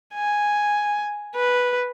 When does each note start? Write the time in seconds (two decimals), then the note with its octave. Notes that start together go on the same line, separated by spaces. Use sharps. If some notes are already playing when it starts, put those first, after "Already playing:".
0.14 G#5
1.36 B4